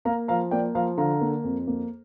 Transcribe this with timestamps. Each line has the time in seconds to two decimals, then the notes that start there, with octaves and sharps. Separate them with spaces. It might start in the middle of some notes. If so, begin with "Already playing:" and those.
0.05 A#3 F5 A#5
0.28 F3 F5 A#5
0.51 A#3 D5 G5
0.75 F3 F5 A#5
0.97 D3 F5 A#5
1.21 A#3
1.44 F2
1.67 A#3